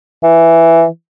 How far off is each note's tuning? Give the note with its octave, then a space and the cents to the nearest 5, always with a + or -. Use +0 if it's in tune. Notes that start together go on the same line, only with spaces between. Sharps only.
E3 +5